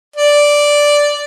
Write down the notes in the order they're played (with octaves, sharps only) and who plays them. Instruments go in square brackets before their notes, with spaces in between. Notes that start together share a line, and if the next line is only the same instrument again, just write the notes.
[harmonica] D5